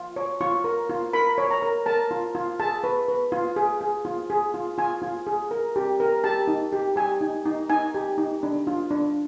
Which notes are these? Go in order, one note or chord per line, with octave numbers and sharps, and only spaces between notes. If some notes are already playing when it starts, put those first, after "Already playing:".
Already playing: F4
C#5
F4 C#6
A#4
F4
A#4 B5
C#5
A#5
A#4
A#4 A5
F4
F4
G#4 A5
B4
B4
F4
G#4
G#4
F4
G#4
F4
F4 G#5
F4
G#4
A#4
G4
A#4
G4 A5
D#4
G4
G4 G#5
D#4
D#4
D#4 G#5
G4
D#4
D4
F4
D4